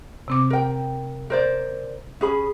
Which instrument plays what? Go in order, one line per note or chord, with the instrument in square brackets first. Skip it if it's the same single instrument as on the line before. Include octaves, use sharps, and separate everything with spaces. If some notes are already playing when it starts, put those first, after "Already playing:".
[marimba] C3 C4 D6
[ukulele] A#4 G5
A#4 C5 D5
C#4 G#4 B5